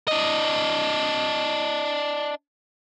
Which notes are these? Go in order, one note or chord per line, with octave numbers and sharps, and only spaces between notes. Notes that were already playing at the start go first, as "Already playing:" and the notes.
D4 D#5